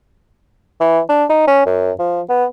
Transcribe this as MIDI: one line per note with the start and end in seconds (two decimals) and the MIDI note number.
0.81 1.00 52
1.09 1.24 62
1.30 1.46 63
1.47 1.64 61
1.66 1.92 42
1.99 2.21 53
2.29 2.45 59